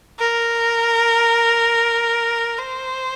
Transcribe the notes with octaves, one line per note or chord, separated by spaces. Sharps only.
A#4
C5